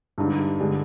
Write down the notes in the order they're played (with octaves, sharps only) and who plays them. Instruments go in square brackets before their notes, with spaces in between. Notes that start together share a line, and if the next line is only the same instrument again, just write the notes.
[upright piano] G2 [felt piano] D3 G#3 D#4 G4 D5
[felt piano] D3 G#3 D4 G4